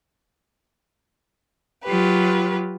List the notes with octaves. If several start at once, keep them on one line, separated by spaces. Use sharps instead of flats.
F#3 F4 G4 B4